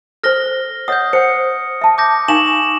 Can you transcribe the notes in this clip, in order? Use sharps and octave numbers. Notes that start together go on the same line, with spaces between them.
A4 C5 F6 A#6 G7
C#5 D#5 F#5 D#6 G6
C5 F#5 C#7
E5 A5
D6 G6 A#6
D#4 F5 G#5 C#6 E7 F#7